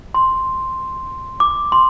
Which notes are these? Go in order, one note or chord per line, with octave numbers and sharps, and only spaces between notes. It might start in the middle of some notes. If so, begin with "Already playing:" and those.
C6
D6
C6